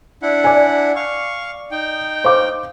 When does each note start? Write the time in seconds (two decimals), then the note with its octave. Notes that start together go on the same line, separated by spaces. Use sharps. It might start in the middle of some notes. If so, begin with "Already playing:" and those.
0.22 D4 E4 F#5
0.44 D5 G#5
0.96 F5 C#6
1.71 D#4 G5
2.24 C5 F5 D6